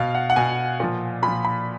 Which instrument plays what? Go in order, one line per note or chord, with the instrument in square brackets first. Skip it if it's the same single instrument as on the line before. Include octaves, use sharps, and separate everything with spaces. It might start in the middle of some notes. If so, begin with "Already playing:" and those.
Already playing: [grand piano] B2 F5
F#5
F#5
B2 G#5
A#2 F3
A#2 F3 B5
B5